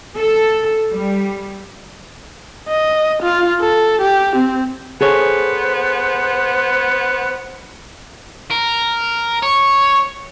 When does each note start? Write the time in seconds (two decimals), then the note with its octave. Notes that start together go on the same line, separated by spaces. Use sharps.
0.18 A4
0.90 G3
2.68 D#5
3.23 F4
3.60 A4
4.01 G4
4.36 C4
5.01 B3 G#4 A4 C5 C#5
8.51 A#4
9.43 C#5